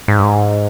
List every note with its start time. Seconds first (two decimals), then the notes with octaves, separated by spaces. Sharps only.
0.08 G#2
0.19 G2
0.23 G#2